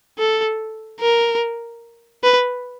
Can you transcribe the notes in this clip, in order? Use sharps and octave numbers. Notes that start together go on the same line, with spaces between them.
A4
A#4
B4